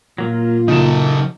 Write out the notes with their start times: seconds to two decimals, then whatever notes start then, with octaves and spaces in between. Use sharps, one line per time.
0.18 A#2 F#3 A#3 F4
0.68 C#3 F#3 D#4 A4 A5